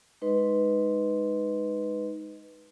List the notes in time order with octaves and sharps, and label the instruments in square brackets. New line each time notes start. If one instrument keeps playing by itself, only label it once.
[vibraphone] G#3 D#4 B4 D#5 C6